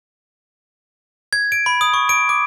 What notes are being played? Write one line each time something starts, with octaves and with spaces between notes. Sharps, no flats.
G#6
D7
B5
D#6
C#6
D7
D6